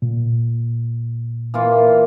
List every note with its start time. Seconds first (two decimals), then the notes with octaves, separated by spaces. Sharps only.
0.02 A#2
1.54 E3 A#3 F4